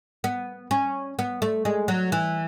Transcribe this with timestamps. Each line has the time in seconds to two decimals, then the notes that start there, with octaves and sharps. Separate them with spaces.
0.24 B3
0.71 C#4
1.19 B3
1.42 A3
1.65 G#3
1.88 F#3
2.12 E3